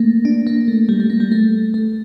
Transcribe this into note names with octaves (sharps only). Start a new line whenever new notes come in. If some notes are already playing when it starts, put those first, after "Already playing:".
Already playing: A3 A#3
D4
A#3
A3
G3
A3
A#3
G3
A3
A3